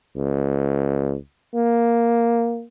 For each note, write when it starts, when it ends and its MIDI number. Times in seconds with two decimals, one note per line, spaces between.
0.16 1.15 37
1.55 2.65 58